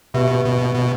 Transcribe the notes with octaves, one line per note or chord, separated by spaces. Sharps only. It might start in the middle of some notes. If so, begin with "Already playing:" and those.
B2 G4 B4 E5
B2
B2